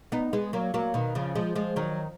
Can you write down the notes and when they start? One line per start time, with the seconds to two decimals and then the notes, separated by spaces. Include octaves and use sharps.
0.12 B3 D#4
0.33 G#3 B3
0.53 F#3 A#3
0.74 F#3 A#3
0.94 B2 D#3
1.15 C#3 F3
1.35 F3 G#3
1.55 F3 G#3
1.76 D#3 F#3